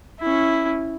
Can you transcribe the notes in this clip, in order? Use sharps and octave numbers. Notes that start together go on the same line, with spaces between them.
C#4 E4